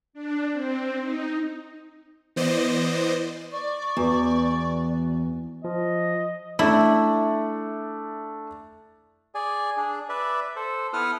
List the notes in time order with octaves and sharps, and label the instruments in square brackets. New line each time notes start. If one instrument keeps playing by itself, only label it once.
[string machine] D4
C4
D#4
[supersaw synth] E3 B3 C5 D5 D#5
[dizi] D5 [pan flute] C#6
[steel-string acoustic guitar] E2 [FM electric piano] B3 F#4 B4
[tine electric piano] F3 [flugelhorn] D#5
[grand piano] A3 D4 [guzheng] E4
[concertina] G#4 D5 G#5
D4 G#4
B4 D5 E5
A4 C5
B3 E4 A4 B4 D#6 F6